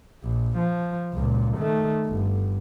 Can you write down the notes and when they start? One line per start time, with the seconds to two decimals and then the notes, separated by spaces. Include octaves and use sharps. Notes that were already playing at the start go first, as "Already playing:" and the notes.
0.23 A#1
0.58 F3
1.14 C#2 A#2
1.57 D#3 A3
2.07 G1